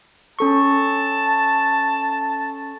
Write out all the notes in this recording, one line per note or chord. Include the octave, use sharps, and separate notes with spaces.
C#4 A4 A5 C#6